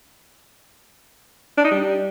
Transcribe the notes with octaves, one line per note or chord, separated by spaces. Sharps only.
D4
D#4
G3